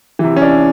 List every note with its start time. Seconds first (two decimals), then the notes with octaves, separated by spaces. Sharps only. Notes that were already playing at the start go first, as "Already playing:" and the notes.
0.19 C3 E3
0.36 C#4
0.42 D4